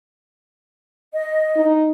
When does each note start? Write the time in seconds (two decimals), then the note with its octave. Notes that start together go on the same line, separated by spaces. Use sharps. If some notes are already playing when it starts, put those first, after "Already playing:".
1.13 D#5
1.56 D#4